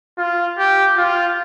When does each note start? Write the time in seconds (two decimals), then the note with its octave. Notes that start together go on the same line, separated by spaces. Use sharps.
0.18 F4
0.58 G4
0.97 F4